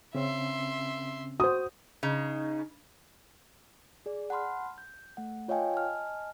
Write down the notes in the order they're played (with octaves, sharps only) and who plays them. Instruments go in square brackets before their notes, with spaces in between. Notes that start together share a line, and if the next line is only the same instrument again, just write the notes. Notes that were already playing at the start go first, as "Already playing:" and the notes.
[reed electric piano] C#3 C4 C#4 [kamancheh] E5 C6
[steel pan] F#4 C5 [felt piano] D#6
[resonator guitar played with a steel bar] C#3 [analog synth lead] D#4
[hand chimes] G#4 D5
F#5 A5 B5 C6 F6
G6
A3 F#5
F4 C#5 D#5 F5 G5 G#5
D#5 G#5 A5 F6